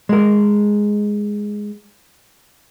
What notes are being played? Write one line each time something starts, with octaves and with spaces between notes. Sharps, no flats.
G#3 A#4